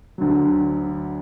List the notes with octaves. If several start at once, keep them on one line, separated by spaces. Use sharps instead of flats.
D2 D3 F#3